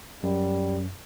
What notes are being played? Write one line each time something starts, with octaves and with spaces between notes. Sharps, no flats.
F#2 G3